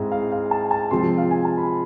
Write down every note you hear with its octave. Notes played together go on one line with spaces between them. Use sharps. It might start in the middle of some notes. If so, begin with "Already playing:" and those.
Already playing: G#2 G#3 C4 E4
F5
F5
A5
A5
C3 F3 G#3 C4 F4 C6
F5
G#5
A5
B5